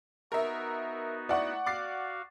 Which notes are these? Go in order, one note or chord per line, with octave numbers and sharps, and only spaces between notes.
B3 D#4 F#4 A#4 E5
E4 D5 F#5 C#6
F#4 F5 D6 A6 C7